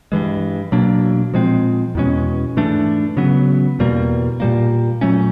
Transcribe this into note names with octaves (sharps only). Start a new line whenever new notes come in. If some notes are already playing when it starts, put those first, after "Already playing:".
G2 E3 G#3
B2 F#3 A#3 D4
A#2 F3 G#3 C4
E2 B2 G#3 C#4
G#2 E3 A3 D4
C#3 F#3 B3
E2 B2 G3 A#3
A#2 G3 A#3
A#2 F#3 A3 C#4